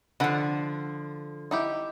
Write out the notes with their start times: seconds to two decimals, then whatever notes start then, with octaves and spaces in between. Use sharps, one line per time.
0.20 D3 F3 A4 F#5 B5
1.51 D#4 E4 G4